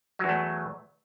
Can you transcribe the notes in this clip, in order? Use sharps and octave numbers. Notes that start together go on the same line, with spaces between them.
E2 F#3 A3